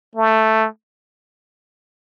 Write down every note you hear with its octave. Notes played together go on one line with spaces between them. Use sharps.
A3